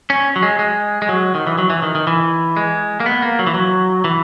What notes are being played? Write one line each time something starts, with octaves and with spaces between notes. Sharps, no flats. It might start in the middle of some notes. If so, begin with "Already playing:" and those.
C#4
F#3
G#3
G#3
G#3
F#3
D#3
E3
F#3
E3
D#3
D#3
E3
G#3
A#3
B3
A#3
F#3
E3
F#3
E3